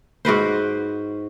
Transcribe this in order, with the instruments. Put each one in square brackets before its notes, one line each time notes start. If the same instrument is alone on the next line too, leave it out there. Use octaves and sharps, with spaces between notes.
[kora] G#2 F#4 B4 C5